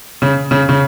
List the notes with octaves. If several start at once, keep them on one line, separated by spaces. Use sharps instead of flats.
C#3
C#3
C#3